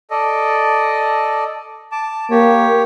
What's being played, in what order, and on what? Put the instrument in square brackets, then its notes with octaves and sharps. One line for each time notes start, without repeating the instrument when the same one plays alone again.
[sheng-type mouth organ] A4 D5 D#5
A5 D6
[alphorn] A#3 [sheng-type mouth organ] G4 C#5